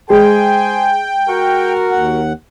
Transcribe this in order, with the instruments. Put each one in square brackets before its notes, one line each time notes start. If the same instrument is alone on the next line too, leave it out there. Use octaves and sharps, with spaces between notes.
[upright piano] G#3 [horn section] G#4 C5 G#5 [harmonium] G5
[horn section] F#4 A#4
[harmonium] D#2 F#5